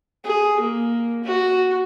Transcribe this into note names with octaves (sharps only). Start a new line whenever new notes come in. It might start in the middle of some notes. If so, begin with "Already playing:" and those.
G#4
A#3
F#4